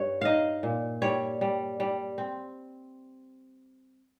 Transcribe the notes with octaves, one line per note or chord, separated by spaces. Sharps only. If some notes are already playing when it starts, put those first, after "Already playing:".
Already playing: G2 C#5
D#4 D#5 F5
A#2
G3 C#5
G3
G3
C4